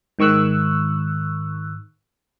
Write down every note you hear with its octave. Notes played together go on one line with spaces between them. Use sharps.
G#2 D#3 C#6 E6 F#6